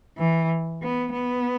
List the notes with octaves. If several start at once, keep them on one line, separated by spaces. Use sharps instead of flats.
E3
B3
B3